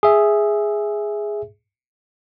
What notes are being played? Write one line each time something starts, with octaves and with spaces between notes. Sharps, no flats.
G#4 E5